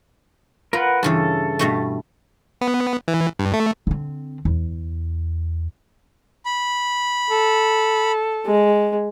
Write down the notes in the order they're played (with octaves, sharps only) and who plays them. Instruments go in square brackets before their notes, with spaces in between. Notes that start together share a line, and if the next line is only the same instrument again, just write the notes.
[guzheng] F4 [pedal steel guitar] A#4 B4 F#5
[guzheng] G2 C#3 E3 [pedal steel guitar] A4
[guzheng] G2 B2 A3
[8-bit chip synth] B3
E3
G2
A3
[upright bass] D3 C4
E2
[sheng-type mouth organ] B5
[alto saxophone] A4
[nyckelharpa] G#3